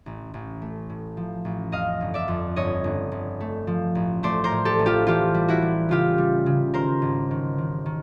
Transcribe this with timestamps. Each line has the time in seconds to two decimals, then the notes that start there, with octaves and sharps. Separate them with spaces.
0.06 A1
0.34 A1
0.62 A3
0.90 A2
1.17 F3
1.45 A1
1.72 F2 D#5 F5
2.01 G1
2.14 D5 E5
2.28 F2
2.56 G1 C#5 D#5
2.84 G1
3.12 G1
3.41 A3
3.67 F3
3.95 A1
4.23 A3 C5 D5
4.44 A#4 C5
4.52 A2
4.65 G4 A4
4.79 A1
4.86 F4 G4
5.07 E3 F4 G4
5.34 G3
5.48 E4 F#4
5.62 G3
5.89 C#3 F4 G4
6.18 G3
6.46 C#3
6.74 D#3 A#4 C5
7.02 G#1
7.31 D#3
7.58 D#3
7.86 D#3